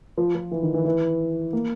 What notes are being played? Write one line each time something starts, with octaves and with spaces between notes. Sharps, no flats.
F3
F3
E3
D#3
E3
E3
A#3